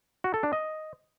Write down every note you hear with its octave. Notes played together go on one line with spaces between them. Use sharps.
F#4
A4
D4
D#5